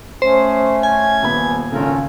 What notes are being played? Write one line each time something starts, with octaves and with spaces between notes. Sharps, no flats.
A3 C#4 G#4 C5
G#5 G#6
D#1 B3 B5
G#1 C#3 C#4 F4 A4 A#4